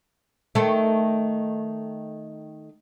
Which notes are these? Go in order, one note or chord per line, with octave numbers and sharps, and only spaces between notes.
D#3 A3